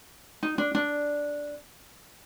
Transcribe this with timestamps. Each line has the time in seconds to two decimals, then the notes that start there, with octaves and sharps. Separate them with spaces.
0.43 D#4
0.58 D4
0.75 D4